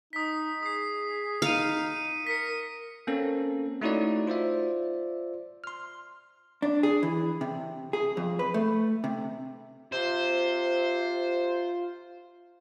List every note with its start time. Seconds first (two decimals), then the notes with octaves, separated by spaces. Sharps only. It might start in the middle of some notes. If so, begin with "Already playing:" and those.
0.13 D#4 D#6 B6
0.63 G#4 D#6 C7
1.42 D#4 F5 C#7 D#7
2.27 A#4 B6 C#7
3.07 A#3 C4 C#4 A4 A#4
3.81 A3 D#4 E4 F#4 C#5 D5
4.27 F4 C5 D5 E5
5.64 C6 F6
6.62 D4
6.83 G#4
7.03 E3
7.41 C3
7.93 G#4
8.17 F2
8.39 B4
8.54 A3
9.04 C3
9.93 C3 F4 C5